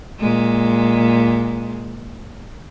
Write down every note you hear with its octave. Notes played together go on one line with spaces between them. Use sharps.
A#2 G#3